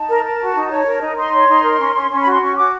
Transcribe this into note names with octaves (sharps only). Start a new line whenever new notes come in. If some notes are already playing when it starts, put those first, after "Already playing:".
Already playing: D#4 A5
A#4
A#4
F#4
D#4
C#5
A#4
D#4
D#4 C6
C#5
D#4
A#4
C#4
C#4
C#4
F#4 B5
C6
C#4 C#6
F#4 D6